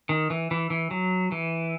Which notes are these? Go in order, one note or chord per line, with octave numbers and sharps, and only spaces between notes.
D#3
E3
E3
E3
F#3
E3